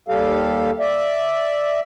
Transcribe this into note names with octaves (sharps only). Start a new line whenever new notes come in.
D#2 G3 G4 A4 F5
D5 E5